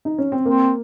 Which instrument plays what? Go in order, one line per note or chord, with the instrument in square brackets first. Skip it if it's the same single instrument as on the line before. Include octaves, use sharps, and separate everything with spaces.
[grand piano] D#4
C#4
C4
[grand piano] A#3 [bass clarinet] C4